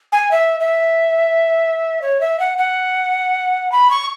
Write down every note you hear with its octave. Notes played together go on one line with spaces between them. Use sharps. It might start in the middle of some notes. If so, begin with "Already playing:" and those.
G#5
E5
E5
C#5
E5
F#5
F#5
B5
C#6